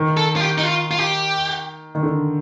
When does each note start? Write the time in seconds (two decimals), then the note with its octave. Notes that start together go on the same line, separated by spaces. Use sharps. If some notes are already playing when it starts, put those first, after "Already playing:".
Already playing: D#3
0.17 A4
0.36 F4
0.41 G4
0.58 D#4
0.63 F4
0.91 F4
0.99 G4
1.95 D#3
2.03 D3